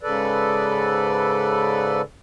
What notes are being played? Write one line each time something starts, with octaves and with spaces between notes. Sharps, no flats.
G#2 C#3 A4 B4 D5